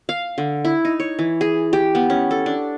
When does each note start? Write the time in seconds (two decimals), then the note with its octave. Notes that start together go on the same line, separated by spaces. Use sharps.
0.09 F5
0.38 D3
0.65 E4
0.85 D#4
1.00 C#5
1.19 E3
1.41 G#4
1.73 G4
1.95 B3
2.10 C#4
2.31 A4
2.46 D4